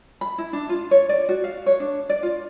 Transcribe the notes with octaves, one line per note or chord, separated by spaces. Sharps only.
B5
E4
D4
F4
C#5
D5
F#4
F5
C#5
D4
D5
F4